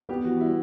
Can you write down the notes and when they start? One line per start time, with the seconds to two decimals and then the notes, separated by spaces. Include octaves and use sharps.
0.09 B3 G4
0.24 E3 F#4
0.40 G3 E4